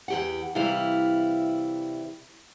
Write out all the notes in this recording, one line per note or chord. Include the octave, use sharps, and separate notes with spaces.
E2 G4 F#5
C3 E3 G3 E4 F5